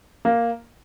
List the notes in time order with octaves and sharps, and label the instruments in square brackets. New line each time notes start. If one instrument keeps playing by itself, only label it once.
[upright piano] A#3